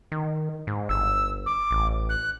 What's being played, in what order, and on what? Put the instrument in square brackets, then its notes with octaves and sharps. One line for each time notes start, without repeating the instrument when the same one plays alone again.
[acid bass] D#3
G#2
[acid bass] G1 [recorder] E6
[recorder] D6
[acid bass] A1
[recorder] F#6